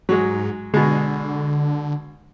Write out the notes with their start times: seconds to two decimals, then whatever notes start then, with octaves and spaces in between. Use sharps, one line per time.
0.09 G#2 F#3 G#3
0.74 B2 D3 G#3